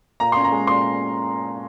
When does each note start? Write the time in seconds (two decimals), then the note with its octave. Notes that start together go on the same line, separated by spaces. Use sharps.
0.20 A#2 A#5
0.32 C#4 C6
0.44 A#5
0.52 G#3
0.67 A#2 C6